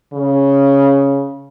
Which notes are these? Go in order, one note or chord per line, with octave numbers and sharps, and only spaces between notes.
C#3